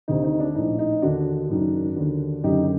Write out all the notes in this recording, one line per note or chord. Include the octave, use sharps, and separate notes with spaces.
D2 C3 D#3 D#4
D#4
D4
A#1 A2 D#4
D#4
D#2 D3 D4 F#4
F#1 F#2 D#3
D#2 D3
F#1 F#2 D3 D#4 G4